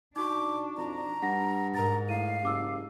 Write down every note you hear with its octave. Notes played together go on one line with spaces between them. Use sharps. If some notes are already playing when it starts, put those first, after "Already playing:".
D4 D#4 F#4 C#6 D6
F2 A#5
G2 F#5 A#6
G#2 A#4 A#5 A6
A2 F5 D#7
F#1 G4 D6 E6